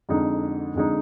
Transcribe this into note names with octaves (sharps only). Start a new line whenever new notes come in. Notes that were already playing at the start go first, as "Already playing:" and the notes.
F2 D3 G#3 D#4
F2 D3 G#3 D#4